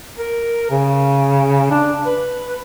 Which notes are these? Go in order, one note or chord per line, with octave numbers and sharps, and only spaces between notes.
A#4
C#3
D4
B4